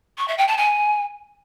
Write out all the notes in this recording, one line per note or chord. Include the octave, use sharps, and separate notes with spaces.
C#6
E5
G5
A5
G#5